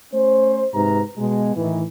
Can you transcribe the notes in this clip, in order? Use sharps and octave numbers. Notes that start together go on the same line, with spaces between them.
A3 C#4 C5
G#2 C3 B4 A#5
B2 G#3
A2 D#3 E3